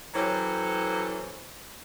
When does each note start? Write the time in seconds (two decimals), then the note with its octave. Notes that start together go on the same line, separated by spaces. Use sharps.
0.14 E3 F#3 C#4 G4 A4 C5